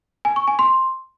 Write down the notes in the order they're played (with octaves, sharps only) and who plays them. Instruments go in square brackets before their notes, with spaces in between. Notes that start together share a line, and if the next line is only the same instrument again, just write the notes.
[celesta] G#5
C#6
G#5
C6